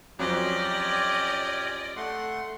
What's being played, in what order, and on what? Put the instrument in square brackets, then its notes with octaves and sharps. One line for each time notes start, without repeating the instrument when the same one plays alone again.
[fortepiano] F2 F#3 C4 [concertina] C#4 G4 [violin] D5 D#5
[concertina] A3 F#5 C6